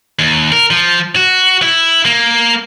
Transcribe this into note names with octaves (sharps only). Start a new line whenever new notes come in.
D#2
A#4
F3
F#4
E4
A#3